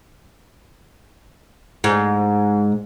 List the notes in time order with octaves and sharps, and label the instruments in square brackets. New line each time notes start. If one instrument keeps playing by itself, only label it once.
[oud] G#2